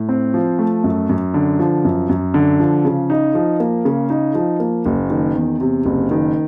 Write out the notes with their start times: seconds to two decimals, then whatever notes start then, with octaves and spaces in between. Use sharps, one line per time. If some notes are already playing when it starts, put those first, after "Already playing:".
Already playing: A2
0.09 C4
0.34 F3
0.59 A3
0.84 F#2
1.09 F#2
1.34 D3
1.59 F3
1.85 F#2
2.09 F#2
2.34 D3
2.60 F3
2.85 C#3
3.10 D#4
3.35 F3
3.60 A#3
3.85 C#3
4.10 D#4
4.35 F3
4.60 A#3
4.86 F#1
5.10 D#3
5.35 E2
5.61 C3
5.85 F#1
6.11 D#3